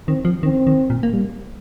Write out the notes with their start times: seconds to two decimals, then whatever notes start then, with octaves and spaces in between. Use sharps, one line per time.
0.08 D#3 C4
0.25 F3
0.43 D#3 C4
0.67 D#3
0.90 A#2
1.03 A#3
1.13 G3